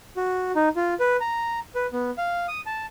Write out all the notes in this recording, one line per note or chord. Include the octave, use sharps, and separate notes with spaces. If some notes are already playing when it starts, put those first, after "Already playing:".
F#4
D#4
F4
B4
A#5
B4
B3
F5
D#6
A5